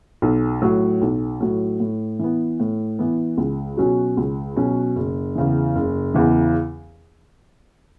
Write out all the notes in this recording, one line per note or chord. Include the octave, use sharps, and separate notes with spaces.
B1
A2 F#3
B1
A2 F#3
A2
E3 B3
A2
E3 B3
C#2
B2 F#3 C#4 F#4
C#2
B2 F#3 C#4 F#4
F#1
E2 C#3 E3
F#1
E2 C#3 E3